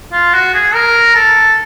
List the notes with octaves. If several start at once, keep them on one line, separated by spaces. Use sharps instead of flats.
F4
F#4
G#4
A#4
A4